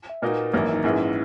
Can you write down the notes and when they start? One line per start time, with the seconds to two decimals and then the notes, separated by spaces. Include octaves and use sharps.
0.10 E5
0.22 A#2 A#3 D#4 F#4 B4 D#5
0.54 G#1 F#2 E3 A#3
0.74 D#4
0.84 A#1 G#2 E3 C#4 E4